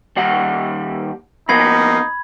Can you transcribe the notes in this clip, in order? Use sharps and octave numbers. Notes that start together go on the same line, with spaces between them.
D#2 G3 F#5
F2 A#3 B3 D#4 B5 G#6